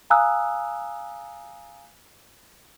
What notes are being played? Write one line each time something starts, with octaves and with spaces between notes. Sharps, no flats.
F5 G#5 A#5 D#6 E6 F#6